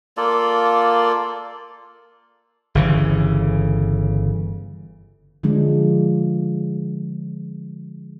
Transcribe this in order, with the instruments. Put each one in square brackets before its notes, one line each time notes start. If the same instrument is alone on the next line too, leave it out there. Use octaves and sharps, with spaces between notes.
[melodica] A#3 F4 A4 D5
[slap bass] G1 C#3 E3
[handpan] D3 F3 G#3 D4